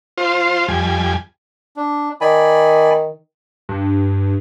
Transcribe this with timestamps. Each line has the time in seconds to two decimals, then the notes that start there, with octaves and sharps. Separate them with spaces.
0.18 F4 C5
0.68 F2 G3 G#5
1.77 D4
2.21 D#3 D5 G#5 B5
3.69 G2